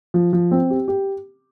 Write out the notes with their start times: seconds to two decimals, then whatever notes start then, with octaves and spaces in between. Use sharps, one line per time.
0.14 F3
0.33 F3
0.51 C4
0.70 G4
0.88 G4